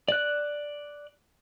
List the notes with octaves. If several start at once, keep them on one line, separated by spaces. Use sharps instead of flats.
D5 F#6